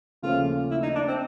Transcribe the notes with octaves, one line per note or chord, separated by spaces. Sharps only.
D#2 C#3 F3 A3 C#4 F4
E4
D#4
D4
C4